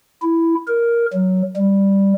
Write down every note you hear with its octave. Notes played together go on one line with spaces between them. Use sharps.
E4
A#4
F#3
G3